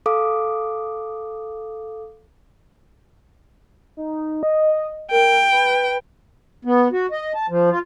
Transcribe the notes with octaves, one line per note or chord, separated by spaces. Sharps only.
A4 F5 D6 D#6
D#4
D#5
A#4 G5
B4
B3
F#4
D#5
A5
F3
F4